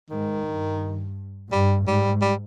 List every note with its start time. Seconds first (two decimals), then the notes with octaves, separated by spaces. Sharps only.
0.10 G#2 D#3
0.46 G2
1.52 G2 G3
1.87 G#2 G3
2.22 G3